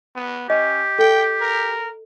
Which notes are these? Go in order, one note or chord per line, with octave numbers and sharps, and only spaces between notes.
B3
C#4 G4 D#5
A4 G5
A#4